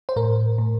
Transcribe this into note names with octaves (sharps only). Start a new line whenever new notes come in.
C5
A2 A#4
A2